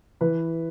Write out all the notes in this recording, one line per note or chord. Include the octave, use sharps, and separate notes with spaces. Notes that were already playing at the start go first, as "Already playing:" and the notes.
E3 B4